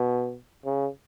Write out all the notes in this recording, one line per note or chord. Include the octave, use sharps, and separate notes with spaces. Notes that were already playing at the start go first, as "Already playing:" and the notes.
Already playing: B2
C#3